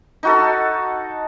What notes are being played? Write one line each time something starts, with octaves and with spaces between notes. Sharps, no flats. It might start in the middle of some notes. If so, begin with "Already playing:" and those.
D#4 F#4 A4